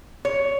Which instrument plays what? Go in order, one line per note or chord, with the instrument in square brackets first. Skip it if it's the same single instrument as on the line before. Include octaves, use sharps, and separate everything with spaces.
[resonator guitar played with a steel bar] C#5